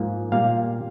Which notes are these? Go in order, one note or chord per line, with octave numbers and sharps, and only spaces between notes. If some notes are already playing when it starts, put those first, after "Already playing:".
Already playing: G#2 F3 A#3
A#2 G3 A#3 F5